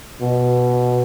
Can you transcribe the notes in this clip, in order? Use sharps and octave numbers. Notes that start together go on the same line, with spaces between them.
B2